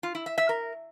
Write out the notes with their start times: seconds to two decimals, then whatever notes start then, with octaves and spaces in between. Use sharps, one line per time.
0.03 F4
0.15 E4
0.26 E5
0.38 E5
0.49 A#4